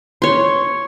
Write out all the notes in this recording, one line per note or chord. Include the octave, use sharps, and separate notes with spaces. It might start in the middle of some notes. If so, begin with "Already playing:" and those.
C#5 C6